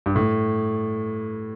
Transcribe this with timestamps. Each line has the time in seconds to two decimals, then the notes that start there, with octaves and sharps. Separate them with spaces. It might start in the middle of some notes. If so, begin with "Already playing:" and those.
0.06 G2
0.16 A2